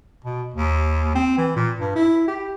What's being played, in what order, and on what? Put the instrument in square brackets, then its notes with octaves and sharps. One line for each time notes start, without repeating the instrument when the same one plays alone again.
[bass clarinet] B2
D#2
C4
E3
A#2
G2
E4
G4